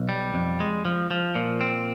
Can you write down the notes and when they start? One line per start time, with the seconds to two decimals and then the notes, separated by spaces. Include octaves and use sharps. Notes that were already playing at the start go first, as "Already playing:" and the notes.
Already playing: B1
0.09 G3
0.34 F2
0.60 G#3
0.85 F3
1.11 F3
1.35 A#2
1.61 C4